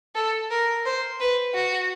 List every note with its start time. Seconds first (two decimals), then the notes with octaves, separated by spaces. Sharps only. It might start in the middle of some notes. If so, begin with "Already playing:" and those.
0.15 A4
0.51 A#4
0.86 C5
1.20 B4
1.55 F#4